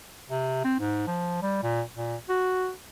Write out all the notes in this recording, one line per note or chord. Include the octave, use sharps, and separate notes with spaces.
C3
C4
G#2
F3
G3
A#2
A#2
F#4